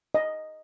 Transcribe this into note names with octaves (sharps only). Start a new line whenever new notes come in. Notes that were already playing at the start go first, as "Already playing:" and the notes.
D#5